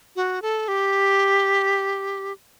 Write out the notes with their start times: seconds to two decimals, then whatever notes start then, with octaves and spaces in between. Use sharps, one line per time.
0.16 F#4
0.42 A4
0.68 G4